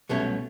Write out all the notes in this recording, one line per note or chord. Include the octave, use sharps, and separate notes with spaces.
C2 B2 F#3 A3 C#4